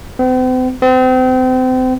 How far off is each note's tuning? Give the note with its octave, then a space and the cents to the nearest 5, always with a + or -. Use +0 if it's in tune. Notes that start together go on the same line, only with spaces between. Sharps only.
C4 -45
C4 -35